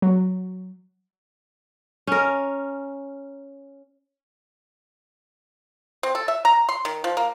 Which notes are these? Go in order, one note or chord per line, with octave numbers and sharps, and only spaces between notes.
F#3
C#4 A#4
C4
A4
E5
A#5
C6
D#3
F3
A#3